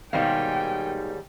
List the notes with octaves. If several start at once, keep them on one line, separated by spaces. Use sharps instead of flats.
D#2 G#2 B2 D#3 G3 F5 G5 G#5